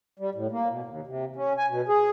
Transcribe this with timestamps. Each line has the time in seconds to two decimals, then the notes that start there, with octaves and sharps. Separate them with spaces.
0.19 G3
0.35 A2
0.52 A#3
0.70 B2
0.86 D#2
1.07 C3
1.36 C#4
1.58 G#5
1.70 B2
1.88 G#4